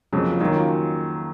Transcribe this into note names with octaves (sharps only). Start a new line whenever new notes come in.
F2 C#3 F#3 A#3 C#4
C#4 F4
D#3 F#3 A#3 D#4 F#4
C#4 F4